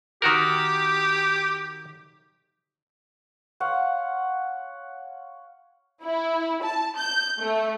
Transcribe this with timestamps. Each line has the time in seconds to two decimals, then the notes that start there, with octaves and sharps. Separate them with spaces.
0.22 D#3 F#4 G4 A#4
3.60 C#5 F5 F#5 C6
6.04 E4
6.63 A5
6.96 G6
7.40 A3